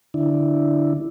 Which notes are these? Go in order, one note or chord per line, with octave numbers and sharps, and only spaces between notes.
D3 D4 E4